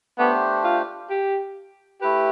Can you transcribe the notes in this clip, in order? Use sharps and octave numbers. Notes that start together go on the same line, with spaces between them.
A3 B3 D4 G4 C5
F4
G4
A3 E4 G4 B4